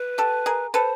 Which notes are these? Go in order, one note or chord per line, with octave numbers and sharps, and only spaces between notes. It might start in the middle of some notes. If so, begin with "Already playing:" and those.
Already playing: B4
G4 A4
G#4 A#4
A4 B4 C5